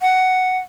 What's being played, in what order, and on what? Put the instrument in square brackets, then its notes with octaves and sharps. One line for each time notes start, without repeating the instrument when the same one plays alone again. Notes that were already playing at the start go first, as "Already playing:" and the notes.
[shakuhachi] F#5